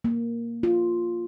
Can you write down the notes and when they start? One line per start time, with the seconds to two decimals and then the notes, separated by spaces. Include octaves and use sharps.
0.04 A#3
0.63 F4